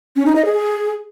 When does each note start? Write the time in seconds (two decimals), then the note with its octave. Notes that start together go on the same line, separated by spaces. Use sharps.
0.16 C#4
0.26 D#4
0.36 D#5
0.45 G#4